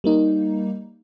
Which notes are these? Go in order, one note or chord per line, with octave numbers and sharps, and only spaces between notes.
G3 A#3 D#4